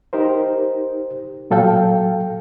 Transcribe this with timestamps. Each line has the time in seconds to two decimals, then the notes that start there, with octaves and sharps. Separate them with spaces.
0.13 D#4 G4 A#4 C5
1.51 A#2 F#3 A4 F5 G5